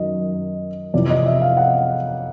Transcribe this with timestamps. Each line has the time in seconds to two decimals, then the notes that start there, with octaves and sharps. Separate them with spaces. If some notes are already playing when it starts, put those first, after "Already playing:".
Already playing: F#2 D#3 F#3 D#5
0.94 F2 C3 E3 D5
1.10 D#5
1.26 E5
1.42 F5
1.57 F#5